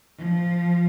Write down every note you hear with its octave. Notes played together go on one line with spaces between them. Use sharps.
F3